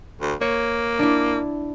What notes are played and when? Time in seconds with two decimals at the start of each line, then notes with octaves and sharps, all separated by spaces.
0.21 D2
0.41 A#3 C#5
0.99 D4 E4